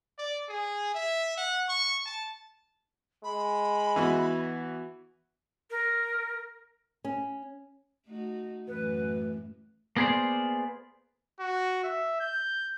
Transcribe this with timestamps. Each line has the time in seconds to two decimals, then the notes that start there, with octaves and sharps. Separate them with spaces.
0.18 D5
0.49 G#4
0.95 E5
1.38 F#5
1.69 C#6
2.06 A5
3.24 G#3 B5
3.96 E3 B3 F#4
5.71 A#4
7.04 C#4
8.07 A3 D#4 F#4
8.68 F#2 A2 E3 B4
9.97 A#3 B3 G#4 A#4 C5 D5
11.40 F#4
11.84 E5
12.20 G6